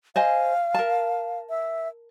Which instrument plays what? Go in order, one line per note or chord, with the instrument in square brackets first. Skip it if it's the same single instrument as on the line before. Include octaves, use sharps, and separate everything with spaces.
[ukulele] C5 D#5 G#5 [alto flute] F5
[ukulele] A#4 A5
[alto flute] E5